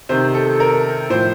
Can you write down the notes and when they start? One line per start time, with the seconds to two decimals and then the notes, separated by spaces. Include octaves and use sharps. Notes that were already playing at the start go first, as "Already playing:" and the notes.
0.09 C3 D#3 C5
0.34 A4
0.60 A#4
1.10 A2 F3 C5